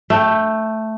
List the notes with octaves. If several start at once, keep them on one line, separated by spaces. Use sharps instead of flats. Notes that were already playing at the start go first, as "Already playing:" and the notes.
A3 G5